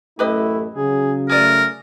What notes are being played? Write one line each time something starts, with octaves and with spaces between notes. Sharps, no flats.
A1 F#2 A3 E4 G4 B4 D#5
C#3 F#3 G#4
A3 G#4 A#4 D5